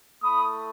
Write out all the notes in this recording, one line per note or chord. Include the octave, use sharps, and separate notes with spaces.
A3 E4 B5 D#6